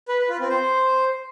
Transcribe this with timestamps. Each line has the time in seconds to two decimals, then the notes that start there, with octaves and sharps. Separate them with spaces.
0.09 B4
0.19 B4
0.29 F4
0.39 C4
0.49 C5